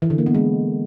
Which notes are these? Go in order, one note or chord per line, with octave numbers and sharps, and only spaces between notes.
E3
D3
A#3
B3
G#3